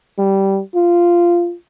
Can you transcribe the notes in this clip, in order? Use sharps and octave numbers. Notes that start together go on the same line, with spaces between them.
G3
F4